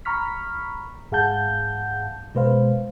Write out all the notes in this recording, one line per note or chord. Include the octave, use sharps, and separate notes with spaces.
A#5 B5 C#6 F6 B6
G#2 G#4 F5 F#5 A5 G6
B2 G#3 B4 C5 F5